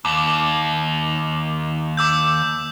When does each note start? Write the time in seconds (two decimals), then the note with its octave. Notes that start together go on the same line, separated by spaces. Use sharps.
0.05 D#2 D6
1.97 D6 E6 G6